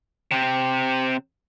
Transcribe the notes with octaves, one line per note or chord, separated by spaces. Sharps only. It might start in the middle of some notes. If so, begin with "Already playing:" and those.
C3 C4